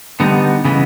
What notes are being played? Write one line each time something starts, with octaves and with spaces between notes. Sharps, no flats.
D3 G3 B3 D#4
C#3 E3 G#3 B3